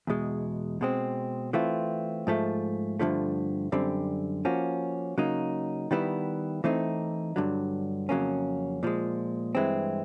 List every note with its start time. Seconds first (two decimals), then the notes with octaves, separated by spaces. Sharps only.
0.07 E2 B2 G#3
0.81 B2 G#3 C4
1.53 E3 A3 C4 F4
2.27 G#2 F3 A3
2.99 G2 D3 F3 A3
3.72 F#2 D3 G3 C4
4.45 F3 A#3 C#4 F#4
5.18 C#3 F#3 A#3 D#4
5.91 D#3 G3 B3 E4
6.64 E3 A3 C4 D#4
7.36 G2 D3 F#3
8.09 F2 C#3 F#3 A#3 C#4
8.83 A#2 F3 G#3
9.55 G2 E3 G#3 C4